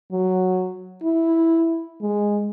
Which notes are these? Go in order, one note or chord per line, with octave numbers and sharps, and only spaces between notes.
F#3
E4
G#3